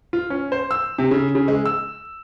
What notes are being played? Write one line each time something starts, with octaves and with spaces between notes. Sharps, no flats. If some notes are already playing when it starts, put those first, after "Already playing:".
F4
C#4
C5
E6
C3
C#3
C#3
G#3
E6